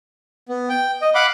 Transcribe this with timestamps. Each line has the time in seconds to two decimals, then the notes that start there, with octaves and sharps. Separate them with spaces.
0.49 B3
0.69 G5
1.02 D#5
1.15 F5 F#5 B5 D6